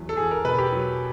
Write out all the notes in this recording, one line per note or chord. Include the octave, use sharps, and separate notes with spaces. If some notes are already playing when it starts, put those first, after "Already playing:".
Already playing: E2 F#3
A4
E2 G#4
A#4
B2 B4
G4
F#3